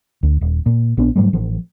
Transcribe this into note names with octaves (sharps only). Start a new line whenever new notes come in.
D2
D#1
A#2
A#1 B3 D4
G#2 F#3 G3 A3
A1 F3